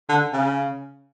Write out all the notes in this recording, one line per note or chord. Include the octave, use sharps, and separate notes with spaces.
D3
C#3